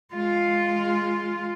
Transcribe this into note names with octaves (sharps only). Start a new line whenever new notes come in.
G#3 F4